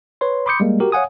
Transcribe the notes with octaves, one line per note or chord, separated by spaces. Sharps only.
B4 C#5 C6
B5 C6 D6 D#6 G6 C#7
G3 G#3 A#3
F#4 G4 A#4
C#5 F5 F#5 G#5 D#6